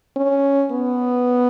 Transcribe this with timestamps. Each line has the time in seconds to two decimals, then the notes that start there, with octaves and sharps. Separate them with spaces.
0.17 C#4
0.71 B3